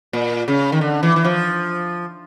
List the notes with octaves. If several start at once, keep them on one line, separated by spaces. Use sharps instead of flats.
A#2
C#3
D#3
D3
E3
E3
F3